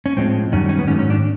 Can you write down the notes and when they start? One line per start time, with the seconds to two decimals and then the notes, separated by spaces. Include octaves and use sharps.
0.06 C#4
0.17 A2 F3 G#3 C4
0.52 F#2 D#3 G3 C#4
0.69 C#4
0.79 B3
0.87 G#2 D#3 F#3 A3 C#4
0.99 C#4
1.10 D4